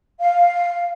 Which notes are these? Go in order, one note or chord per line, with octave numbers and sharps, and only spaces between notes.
F5